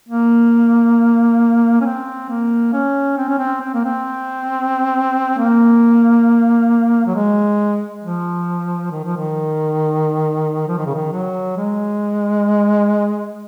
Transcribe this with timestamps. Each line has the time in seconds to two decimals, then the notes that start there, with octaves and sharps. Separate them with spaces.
0.09 A#3
1.81 C#4
1.86 C4
2.29 A#3
2.73 C#4
3.17 C4
3.29 C#4
3.39 C4
3.62 C4
3.74 A#3
3.85 C4
5.38 A#3
7.06 F#3
7.15 G#3
8.04 F3
8.92 D#3
9.04 F3
9.17 D#3
10.68 F3
10.78 D#3
10.86 C#3
10.94 D#3
11.12 F#3
11.57 G#3